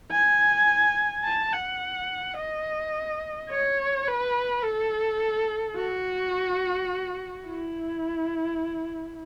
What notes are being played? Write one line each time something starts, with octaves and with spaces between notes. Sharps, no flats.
G#5
A5
F#5
D#5
C#5
B4
A4
F#4
E4